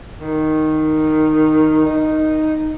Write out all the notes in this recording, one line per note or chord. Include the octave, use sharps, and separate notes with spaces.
D#3
D#4